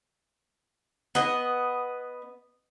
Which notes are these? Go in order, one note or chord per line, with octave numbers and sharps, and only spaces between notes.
B3 D#5